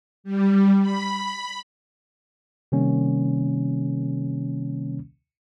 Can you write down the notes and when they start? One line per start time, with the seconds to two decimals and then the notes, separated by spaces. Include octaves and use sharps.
0.24 G3
0.81 B5
2.72 C3 D#3 G3 A#3 C#4